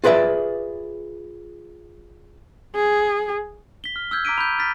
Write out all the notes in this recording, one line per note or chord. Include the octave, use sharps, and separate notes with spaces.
F4 G#4 B4 D5 E5
G#4
B6 G7
F6
E6 F6 G6 G#6
A#5 D6 B6 D7 D#7
B5 G6
F6 A6 B6